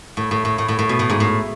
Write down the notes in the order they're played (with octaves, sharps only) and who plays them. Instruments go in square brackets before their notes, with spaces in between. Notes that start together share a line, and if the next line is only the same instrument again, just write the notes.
[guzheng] A2
A2
A2
A2
A2
A2
B2
A2
G#2
A2